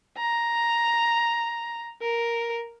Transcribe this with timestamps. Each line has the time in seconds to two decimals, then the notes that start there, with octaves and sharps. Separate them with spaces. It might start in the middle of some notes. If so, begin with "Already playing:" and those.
0.17 A#5
2.02 A#4